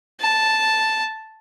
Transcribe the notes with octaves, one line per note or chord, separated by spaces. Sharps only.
A5